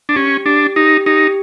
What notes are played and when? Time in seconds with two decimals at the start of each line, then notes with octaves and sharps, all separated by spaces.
0.09 D4
0.16 C#4 G4
0.46 D4 G4
0.76 D#4 G4
1.06 D#4 G4